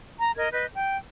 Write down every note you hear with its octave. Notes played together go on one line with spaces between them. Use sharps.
A#5
A#4 D#5 G#6
B4 D#5 G6
G5